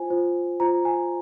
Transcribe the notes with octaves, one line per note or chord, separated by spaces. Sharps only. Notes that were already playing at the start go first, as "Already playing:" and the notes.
Already playing: F4 C5 G#5
F4 C5
F4 C5 A#5
G#5